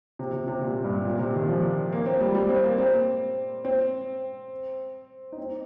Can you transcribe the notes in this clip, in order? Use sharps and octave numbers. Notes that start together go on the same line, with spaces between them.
C3
C3
C3
A#2
G2
A#2
C3
D#3
F3
A#3
C4
G3
G3
C4
A#3
C4
C4
D#4
C4